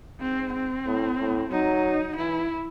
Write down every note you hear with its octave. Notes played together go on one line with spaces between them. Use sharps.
G#2 C4
C4
A2
A2
F#3 D#4
E3 E4